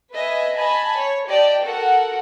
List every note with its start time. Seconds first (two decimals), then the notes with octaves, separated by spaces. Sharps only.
0.13 B4 D#5 E5 G#5
0.57 D#5 G#5 A5 B5
0.97 C#5
1.28 G4 D5 D#5 G5 A5
1.63 F#4 A4 A#4 F#5